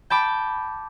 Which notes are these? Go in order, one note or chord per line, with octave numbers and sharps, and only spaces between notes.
G5 A5 B5 D6